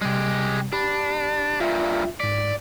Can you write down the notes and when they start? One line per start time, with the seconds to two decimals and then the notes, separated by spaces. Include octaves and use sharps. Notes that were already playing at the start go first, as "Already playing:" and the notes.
0.01 C3 G3 G#3 G4
0.73 D4 G4 B5
1.60 G2 A#2 F4 E5
2.20 G#2 D5 B6